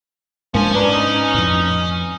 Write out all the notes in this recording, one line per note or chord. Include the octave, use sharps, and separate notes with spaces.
G#2 F3 G#3 A#3 C#4 D4 G#5
D4 B4 A#5
D#4
F2 A2